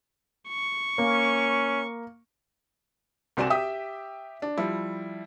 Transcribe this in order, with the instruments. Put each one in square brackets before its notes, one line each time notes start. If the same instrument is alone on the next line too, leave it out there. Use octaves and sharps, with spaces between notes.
[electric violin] C#6
[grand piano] A#3 [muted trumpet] C#4
[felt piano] C2 C4 F#4 D5 G#5 E7
G4 E5 G5 D#6
D4
F3 G3 E4